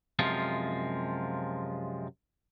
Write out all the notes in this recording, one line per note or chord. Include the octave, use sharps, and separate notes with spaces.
F#2 C3 F3 G#3 F4